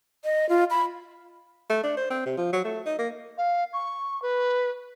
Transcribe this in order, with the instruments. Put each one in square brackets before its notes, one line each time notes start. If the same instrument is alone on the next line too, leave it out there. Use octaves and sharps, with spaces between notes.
[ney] D#5
F4
B5
[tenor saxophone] A3
D4
C5
C4
C3
F3
F#3
A3
D#4
A#3
[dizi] F5
C#6
B4